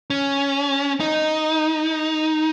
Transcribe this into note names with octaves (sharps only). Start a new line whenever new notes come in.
C#4
D#4